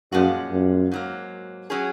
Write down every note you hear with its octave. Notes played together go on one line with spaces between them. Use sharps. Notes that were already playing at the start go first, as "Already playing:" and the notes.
F#2 A#2 F3 G#3 C#4 F#4
F#2
G#2 F#3 A#3
F#3 C#4 G#4